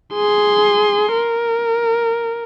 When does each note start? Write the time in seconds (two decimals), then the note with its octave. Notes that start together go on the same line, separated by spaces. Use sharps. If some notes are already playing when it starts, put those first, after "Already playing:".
0.14 G#4 C6
1.13 A#4